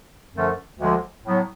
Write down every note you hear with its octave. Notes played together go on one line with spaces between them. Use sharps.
F#2 D3 F3 A3 C#4
D2 D3 F3 G#3
A2 F#3 B3